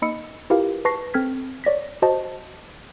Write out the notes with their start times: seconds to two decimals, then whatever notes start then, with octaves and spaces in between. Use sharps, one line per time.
0.02 A#3 D#4 D#5 B5 E6 C#7
0.50 E4 F4 G4 A#4 B4 F5
0.85 B4 A5 C#6 A#6 C7
1.14 C4 A4 F6 G#6 B6
1.64 C#5 D5 A#6 B6
2.02 F#4 C5 D#5 A5